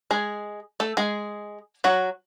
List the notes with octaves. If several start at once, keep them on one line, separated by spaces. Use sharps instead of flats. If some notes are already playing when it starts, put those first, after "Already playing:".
G#3 G#4
A3 A4
G#3 G#4
F#3 F#4